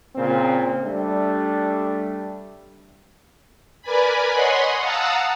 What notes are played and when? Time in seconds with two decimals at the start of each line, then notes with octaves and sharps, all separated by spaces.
0.16 A#2 C#3 C4
0.85 G3 A3 D4
3.82 A#4 B4 D5 G#5 B5
4.32 C#5 D#5 F#5 G#5 B5 C6
4.79 F5 F#5 A5 A#5 D#6 E6